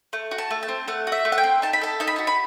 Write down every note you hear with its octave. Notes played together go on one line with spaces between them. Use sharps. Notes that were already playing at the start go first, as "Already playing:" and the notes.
A3
F#4
A5
A3
A5
C4
A3 F#5
F#4
E5
A3
F#5
G5
C4
D#4 A5
B5
A4 A5
D#4 A5
B5
F#4 A5
B5